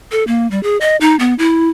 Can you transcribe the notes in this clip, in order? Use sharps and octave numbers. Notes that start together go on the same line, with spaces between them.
A4
A#3
G3
G#4
D#5
D#4
B3
E4